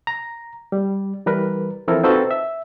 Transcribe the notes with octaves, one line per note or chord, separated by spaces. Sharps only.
A#5
G3
E3 G3 A#4 B4
E3 F3 C4 E4 A4 A#4
C4 D#4 F4 F#4 A4 B4
E5